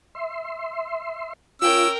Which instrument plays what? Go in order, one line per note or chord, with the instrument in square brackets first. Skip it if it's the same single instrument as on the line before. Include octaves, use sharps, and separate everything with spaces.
[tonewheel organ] E5 C6
[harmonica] C#4 E6 [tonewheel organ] F4 [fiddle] A#4 G5